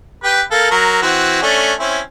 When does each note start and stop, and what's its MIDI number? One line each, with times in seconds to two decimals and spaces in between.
0.24 0.42 67
0.24 0.42 71
0.24 0.42 79
0.51 0.71 58
0.51 0.71 69
0.51 0.71 77
0.71 0.99 54
0.71 0.99 70
1.02 1.42 52
1.02 1.42 60
1.02 1.42 66
1.42 1.73 57
1.42 1.73 61
1.42 1.73 62
1.80 1.99 60
1.80 1.99 61
1.80 1.99 64